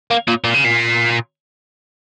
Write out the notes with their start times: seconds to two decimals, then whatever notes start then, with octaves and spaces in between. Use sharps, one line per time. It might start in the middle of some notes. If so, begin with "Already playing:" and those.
0.11 A#3
0.28 A#2
0.44 A#2
0.54 C#3
0.64 A#2